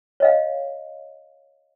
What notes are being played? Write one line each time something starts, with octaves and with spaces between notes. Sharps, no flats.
C#5 D#5 F5